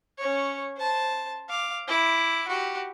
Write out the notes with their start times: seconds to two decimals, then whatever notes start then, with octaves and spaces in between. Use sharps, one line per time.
0.18 C#4 C#5
0.77 C5 A5
1.49 F5 D6
1.87 E4 D6
2.48 F#4 G4